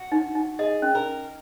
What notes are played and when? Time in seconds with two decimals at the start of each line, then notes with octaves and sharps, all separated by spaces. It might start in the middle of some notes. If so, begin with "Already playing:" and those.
Already playing: F#4
0.12 D#4
0.35 D#4
0.59 G#4 D#5
0.82 C#4
0.95 A#4